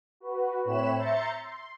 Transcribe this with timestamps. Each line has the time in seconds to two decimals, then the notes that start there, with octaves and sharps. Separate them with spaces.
0.20 F#4 B4
0.65 A2 C4 C#5 B5 F#6 E7
0.96 E5 A#5 C6 G6 A6 C#7
1.43 C6